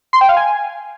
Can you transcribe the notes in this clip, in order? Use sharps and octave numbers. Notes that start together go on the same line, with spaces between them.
C6
G5
F5
G#5